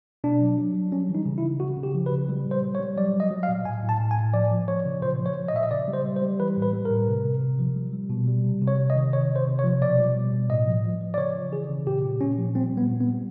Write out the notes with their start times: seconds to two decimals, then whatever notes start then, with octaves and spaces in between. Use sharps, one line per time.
0.24 B2 D4
0.41 F#3
0.58 F#3
0.74 F#3
0.92 G3 C#4
1.09 E3
1.15 D#4
1.26 C#3
1.38 E4
1.43 C#3
1.60 C#3 F#4
1.77 C#3
1.83 G4
1.95 F3
2.06 B4
2.12 C#3
2.29 G3
2.46 A#2
2.51 C5
2.63 G3
2.75 C#5
2.80 G3
2.97 F#3 D5
3.14 F#3
3.20 D#5
3.31 F#3
3.43 F5
3.49 A#2
3.65 A2 G#5
3.83 A2
3.89 A5
4.00 A2
4.11 G#5
4.17 A2
4.34 F3 D5
4.51 F3
4.68 F3 C#5
4.85 C#3
5.02 A#2 C5
5.20 F3
5.26 C#5
5.36 F3
5.48 D#5
5.53 A#2 E5
5.63 D#5
5.71 C#3 D5
5.88 G3
5.93 C5
6.05 G3
6.16 C5
6.22 G3
6.40 E3 B4
6.57 A2
6.62 B4
6.73 G3
6.85 A#4
6.91 A2
7.08 C3
7.25 C3
7.42 C3
7.59 F3
7.76 G3
7.93 G3
8.10 B2
8.27 G3
8.45 C3
8.62 C3
8.68 C#5
8.79 C3
8.90 D#5
8.96 D#3
9.13 C3 C#5
9.30 C3
9.36 C5
9.47 C3
9.59 C#5
9.64 F3
9.81 B2 D5
9.99 G3
10.16 B2
10.33 B2
10.50 A2 D#5
10.67 F3
10.85 F3
11.01 F3
11.14 D5
11.18 C#3 C#5
11.35 C#3
11.52 E3 G#4
11.69 C#3
11.87 A#2 G4
12.04 A#2
12.21 A#2 C#4
12.38 F3
12.55 G3 C4
12.72 A#2
12.77 B3
12.89 A#2
13.01 B3
13.07 G3